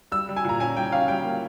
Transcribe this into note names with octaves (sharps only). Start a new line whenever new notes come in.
G3 E6
G3
G#5
A#2 A#5
C#4 G#5
G3 G5
C#4 F5
G3 G5
A#3